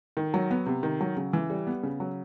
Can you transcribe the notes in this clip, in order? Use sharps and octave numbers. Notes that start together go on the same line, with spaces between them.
D#3
F#3
B3
C3
D#3
F#3
C#3
E3
G3
B3
C#3
F#3